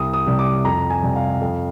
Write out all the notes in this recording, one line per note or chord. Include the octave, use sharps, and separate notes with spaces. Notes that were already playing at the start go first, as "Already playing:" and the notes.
Already playing: C2 D#6
D#6
C3 G3
D6
F2 A#5
G#5
C3 G3
F5
F2